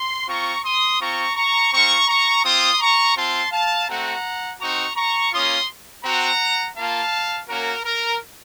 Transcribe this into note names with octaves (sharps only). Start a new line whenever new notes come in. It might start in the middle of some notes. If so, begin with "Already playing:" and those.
Already playing: C6
C4 F4 A#5 C#6
C6 D#6
C4 F4 A#5 C#6
A#5 C#6
C4 F4 A#5 C#6
A#5 C#6
C4 F4 C6 D#6
A#5 C#6
C4 F4 A5 C6
F5 A5
A3 C4 F#4 F#5 A#5
C4 D#4 F#4 A#5 C#6
A#5 C#6
A#3 C#4 F4 C6 D#6
C4 F#4 F#5 A#5
A#3 F4 F5 A5
A#3 C#4 F#4 A#4
A#4